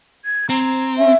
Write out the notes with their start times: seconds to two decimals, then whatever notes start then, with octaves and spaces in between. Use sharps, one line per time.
0.25 G#6
0.49 C4 A#5
0.98 C#4 E5